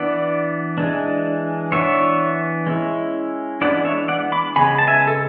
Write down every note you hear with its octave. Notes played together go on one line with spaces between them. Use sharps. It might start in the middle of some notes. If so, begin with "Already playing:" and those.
Already playing: E3 B3 D4 D5 F#5
E3 G#3 D4
E3 B3 D4 C#5 E5
G#3 C#4 E4
E3 G#3 B3 D4 D5 F#5
C#5 E5
D5 F#5
B5 D6
C#3 G#3 B3 G#5 B5
A5
E5 G#5
A4